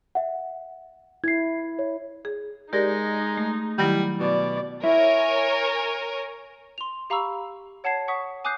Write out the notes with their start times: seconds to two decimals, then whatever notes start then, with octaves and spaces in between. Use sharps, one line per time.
0.15 E5 F#5
1.24 E4 G#6 C7
1.79 C#5
2.25 G#4
2.73 G#3 D#4 G4 A#4 D5
3.38 A3
3.78 D#3 F#3 G3 E4
4.20 B2 D5
4.83 E4 A#4 C#5 G#5
6.78 C6 F7
7.10 G4 F5 A#5 B5 C#6 E6
7.84 C#5 F#5 A5 G#6 C7
8.08 F#5 C#6 D#6 B6
8.44 G#5 D6 D#6 F#6 G6 C7